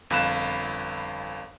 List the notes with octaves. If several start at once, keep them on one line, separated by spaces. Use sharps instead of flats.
G1 F2 F5 B5 F#6 E7